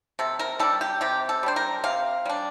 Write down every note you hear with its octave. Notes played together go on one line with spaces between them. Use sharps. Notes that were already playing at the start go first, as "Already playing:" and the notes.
C3 A4
A#4
G3 D4 A4
G4
C3 G4
A4
G3 D4 C5
A#4
C3 F5
G3 D4